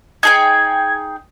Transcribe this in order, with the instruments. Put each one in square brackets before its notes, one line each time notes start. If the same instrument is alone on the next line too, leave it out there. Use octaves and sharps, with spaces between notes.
[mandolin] D#4 G#4 G5 [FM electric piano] G#6